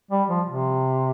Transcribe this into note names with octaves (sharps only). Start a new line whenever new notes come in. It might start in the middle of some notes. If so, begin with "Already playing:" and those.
G3
F3
C3